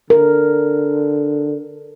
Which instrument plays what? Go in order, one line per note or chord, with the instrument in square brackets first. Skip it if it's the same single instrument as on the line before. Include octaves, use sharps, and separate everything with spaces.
[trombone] D3 [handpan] A#4